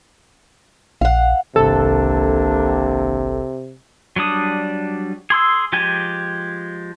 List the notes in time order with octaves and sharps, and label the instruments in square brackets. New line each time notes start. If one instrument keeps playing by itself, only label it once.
[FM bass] A#1 [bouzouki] F5 F#5
[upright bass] G1 C2 [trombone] C3 [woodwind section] D#3 A#3 D4 [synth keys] A4
[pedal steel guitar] F#3 G3 D4 D#6
G#4 C6 E6
F3 G#3 G4 G#5